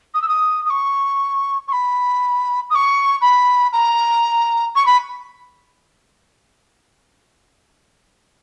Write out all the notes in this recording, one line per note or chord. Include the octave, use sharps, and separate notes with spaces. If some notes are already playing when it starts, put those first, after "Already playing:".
D#6
E6
D#6
D#6
C#6
C#6
B5
D#6
C#6
B5
A#5
C#6
B5